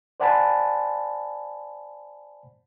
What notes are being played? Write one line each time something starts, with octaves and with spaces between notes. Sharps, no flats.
C5 D5 F#5 G#5 A5 B5